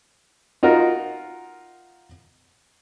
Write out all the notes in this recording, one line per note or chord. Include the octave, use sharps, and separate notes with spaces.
D#4 F4 F#4 A#4